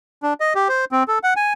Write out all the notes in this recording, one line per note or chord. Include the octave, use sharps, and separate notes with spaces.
D4
D#5
G4
C5
C4
A4
F#5
G#5